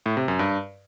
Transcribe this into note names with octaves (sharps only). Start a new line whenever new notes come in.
A2
C3
F#2
G2